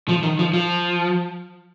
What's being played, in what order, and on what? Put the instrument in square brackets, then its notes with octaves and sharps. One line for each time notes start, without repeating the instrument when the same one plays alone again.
[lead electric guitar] F3
D#3
F3
F3